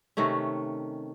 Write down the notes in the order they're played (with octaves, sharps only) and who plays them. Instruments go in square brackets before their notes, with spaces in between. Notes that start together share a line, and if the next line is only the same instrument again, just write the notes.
[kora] C3 D#3 A3 C#4